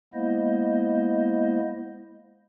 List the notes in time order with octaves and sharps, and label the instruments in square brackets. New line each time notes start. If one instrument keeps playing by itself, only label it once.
[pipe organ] G#3 A#3 B3 E4 C5 D#5